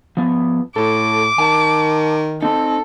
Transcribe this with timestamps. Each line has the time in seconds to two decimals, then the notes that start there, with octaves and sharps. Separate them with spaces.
0.17 F3 B3
0.76 A2 A4 D6
1.38 D#3 G#5 A5
2.42 C4 D#4 A4